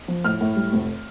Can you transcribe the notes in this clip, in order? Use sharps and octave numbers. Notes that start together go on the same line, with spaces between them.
F3
A2 F6
A2
G3
F1